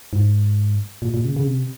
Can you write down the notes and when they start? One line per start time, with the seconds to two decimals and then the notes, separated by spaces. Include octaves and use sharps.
0.13 G#2
1.02 A#2
1.14 A#2
1.25 C#3
1.36 C#3
1.47 C3